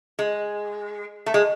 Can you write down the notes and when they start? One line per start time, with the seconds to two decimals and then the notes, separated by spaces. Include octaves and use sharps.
0.19 G#3
1.26 A3
1.34 G#3